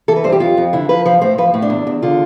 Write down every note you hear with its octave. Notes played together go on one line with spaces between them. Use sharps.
E3 A4
B4
G2 C5
G4
F2 F4
F2
D3 E4
F3 B4
F3 C5
A2 C5
F3 B4
A2
D4
E2
E2
D3 F4